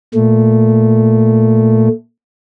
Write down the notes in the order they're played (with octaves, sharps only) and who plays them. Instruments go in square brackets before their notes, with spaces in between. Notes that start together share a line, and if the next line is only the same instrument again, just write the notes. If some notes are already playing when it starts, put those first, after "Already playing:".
[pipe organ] A#2 A3